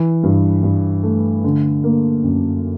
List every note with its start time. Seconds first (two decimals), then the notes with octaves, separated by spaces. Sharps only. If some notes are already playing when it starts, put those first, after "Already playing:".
Already playing: E3
0.23 G2
0.63 G2
1.03 A3
1.44 D3
1.84 A#3
2.24 F#2